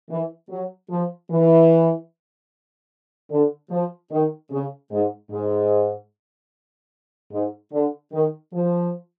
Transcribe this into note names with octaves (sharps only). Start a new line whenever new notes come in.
E3
F#3
F3
E3
D3
F3
D#3
C#3
G#2
G#2
G#2
D3
D#3
F3